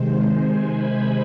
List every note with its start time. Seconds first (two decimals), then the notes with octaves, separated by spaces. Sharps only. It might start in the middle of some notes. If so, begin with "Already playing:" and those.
Already playing: C3 D#3 G#3 C5
0.25 G#5
0.64 B5